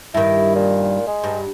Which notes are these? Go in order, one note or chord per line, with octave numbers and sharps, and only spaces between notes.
G2 D#3 E4
A#2
G#3
G2